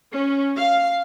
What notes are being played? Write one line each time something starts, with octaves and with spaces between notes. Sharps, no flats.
C#4
F5